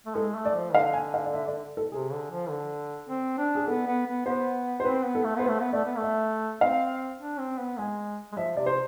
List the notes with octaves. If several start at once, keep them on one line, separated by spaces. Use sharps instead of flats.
A3
G#3 A4
A3
D5
F3
D3 F5
G#5
F5
D5
E5
D5
A4
C3 G#4
D3
F3
D3
C4
D4
G#4
B3 A4
B3
B3
B3 C5
C5
C4 B4
B3
A4
A3
B3 C5
B4
A3
B3
A3 D5
B3
A3
E5
C4 F5
D4
C4
B3
G#3 G#5
G#3
F3 E5
C3 D5
C5